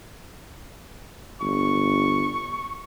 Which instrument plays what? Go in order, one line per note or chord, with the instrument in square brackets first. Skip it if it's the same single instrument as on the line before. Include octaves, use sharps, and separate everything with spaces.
[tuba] G1 [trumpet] C#6